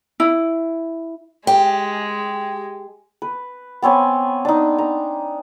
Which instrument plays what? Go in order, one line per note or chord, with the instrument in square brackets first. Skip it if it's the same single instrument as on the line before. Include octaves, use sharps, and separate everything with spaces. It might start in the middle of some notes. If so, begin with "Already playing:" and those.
[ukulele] E4
[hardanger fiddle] G#3 [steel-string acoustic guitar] G4
[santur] B4
B3 C4 C#5 G#5
D4 D#4
A#5